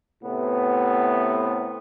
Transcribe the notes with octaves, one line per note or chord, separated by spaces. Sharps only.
A2 C3 B3